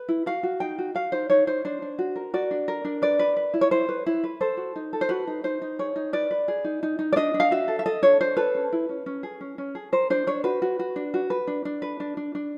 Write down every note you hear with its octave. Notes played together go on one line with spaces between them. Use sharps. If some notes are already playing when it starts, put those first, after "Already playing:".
Already playing: B4
E4
F#4 F5
F#4
D#4 G5
F#4
F#4 F5
D#4 C5
D#4 C#5
D#4 C5
D4 C5
D4
F#4
A#4
F#4 D5
D4
A#4
D4
B4 D5
B4
B4
E4
C#5
E4 C5
B4
E4
B4
A4 C5
F#4
D#4
A4
C5
F#4 B4
D#4
D#4 C5
D#4
G#4 C#5
D#4
B4 D5
B4
G#4
D#4
D#4
D#4
D5
D4 D#5
D4
F5
F#4 E5
A4
E5
A4 D#5
D4 C#5
D4 C5
A4 B4
C#4
E4
C#4
C#4
G#4
C#4
C#4
G#4
A#4 C5
D4 C5
D4 C#5
F#4 B4
F#4
F#4
D4
F#4
B4
D4
D4
B4
D4
D4
D4